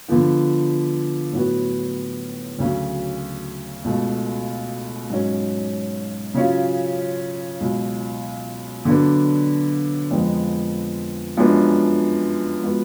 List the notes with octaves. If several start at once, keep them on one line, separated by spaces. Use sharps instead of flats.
D3 F3 B3
A2 F#3 B3 F#4
D2 C#3 F#3
C#2 B2 A3
G#2 F#3 C#4
C#3 F#3 C#4 F4
C#2 B2 F#3
D3 F#3 B3 D4
F2 F3 G#3 B3
F#2 F3 G#3 B3 D4
F3 G#3 B3 F#4